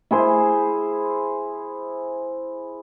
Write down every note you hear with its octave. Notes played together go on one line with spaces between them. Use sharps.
E4 G#4 C5